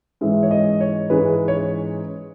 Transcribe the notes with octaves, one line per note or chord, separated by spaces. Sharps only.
G#2 E3 G#3 C#4 E5
C#5
D#5
C#5
G#2 E3 G#3 C#4 B4
C#5